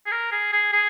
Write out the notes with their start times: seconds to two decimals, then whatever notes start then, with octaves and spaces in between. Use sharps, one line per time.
0.06 G#4
0.12 A#4
0.32 G#4
0.52 G#4
0.73 G#4